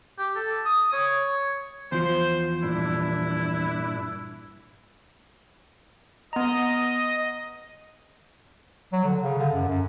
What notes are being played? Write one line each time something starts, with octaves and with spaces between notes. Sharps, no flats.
G4
A4
D#6
C#5
E2 F3 C5
G2 A#2 D4 E4
B3 D#5 A#5
F#3
D3
C#3
D3
F#2
F#2